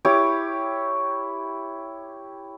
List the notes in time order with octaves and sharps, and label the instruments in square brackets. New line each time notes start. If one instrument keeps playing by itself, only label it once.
[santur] E4 G4 C#5 D6